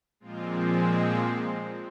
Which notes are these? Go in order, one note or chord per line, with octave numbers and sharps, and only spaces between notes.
A#2 F3 G#3 C4 F4